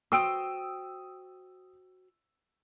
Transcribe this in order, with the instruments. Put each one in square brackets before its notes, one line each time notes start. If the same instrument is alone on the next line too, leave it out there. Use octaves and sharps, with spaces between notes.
[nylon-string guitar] F#4 C5 G5 [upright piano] D#6 E6 D7